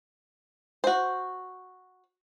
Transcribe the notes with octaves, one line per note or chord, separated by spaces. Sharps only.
F#4 C5